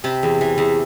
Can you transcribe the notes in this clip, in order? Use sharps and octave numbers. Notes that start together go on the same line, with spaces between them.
C3 A5 B5
E2
E3
E2